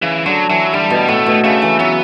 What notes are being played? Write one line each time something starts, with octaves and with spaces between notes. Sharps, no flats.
C#3 E3
D3 F#3
E3 F#3
D3 G3
B2
A2 A3
B2
C#3 A3
E3
F#3 B3